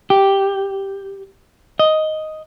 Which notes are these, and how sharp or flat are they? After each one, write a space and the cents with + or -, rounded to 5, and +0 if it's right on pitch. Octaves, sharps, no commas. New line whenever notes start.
G4 +0
D#5 +5